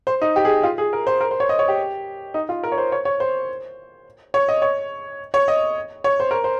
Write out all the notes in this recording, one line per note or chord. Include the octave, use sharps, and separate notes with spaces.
C5
D#4
G4
G#4
F4
G#4
A#4
C5
A#4
C5
C#5
D#5
C#5
G4
D#4
F4
A#4
C#5
C5
C#5
C#5
C5
C#5
D#5
C#5
C#5
D#5
C#5
C5
A#4
C5